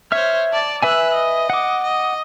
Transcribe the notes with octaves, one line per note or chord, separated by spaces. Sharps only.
C5 C#5 E5 F6
D5 A5
B4 E5 G#5 E6 F#6
D#5
F#5 D6
D#5